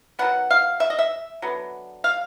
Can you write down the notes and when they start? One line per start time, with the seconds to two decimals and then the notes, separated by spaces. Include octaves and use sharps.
0.19 D#3 F#3 B3 F#5
0.51 F5
0.80 E5
0.90 D#5
0.99 E5
1.42 D3 F#3 B3
2.04 F5